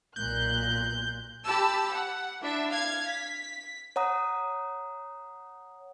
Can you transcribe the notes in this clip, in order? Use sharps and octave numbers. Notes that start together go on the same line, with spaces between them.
B1 A#2 F#6 G6
G4 A5 B5 E6
F#5
D4 E4 E5
F5 G#6
B6
C#5 F#5 A#5 D#6